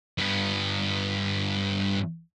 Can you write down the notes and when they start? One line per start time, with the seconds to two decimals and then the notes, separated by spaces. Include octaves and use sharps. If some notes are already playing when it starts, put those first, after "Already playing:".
0.18 G2 B3